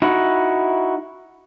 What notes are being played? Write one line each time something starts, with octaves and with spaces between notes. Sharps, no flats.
D#4 E4 F#4